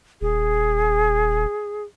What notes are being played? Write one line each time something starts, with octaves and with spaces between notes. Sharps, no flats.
D#1 G#4